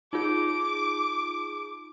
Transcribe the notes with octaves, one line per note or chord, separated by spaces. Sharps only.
D#4 F4 G#4 D6